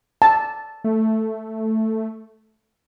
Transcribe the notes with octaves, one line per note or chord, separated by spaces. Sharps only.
A5
A3